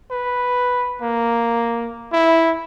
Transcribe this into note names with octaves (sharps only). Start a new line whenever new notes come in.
B4
A#3
E4